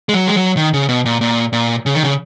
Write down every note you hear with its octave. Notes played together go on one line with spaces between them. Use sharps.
G#3
F#3
G#3
F#3
D#3
C#3
B2
A#2
A#2
A#2
C#3
D#3
C#3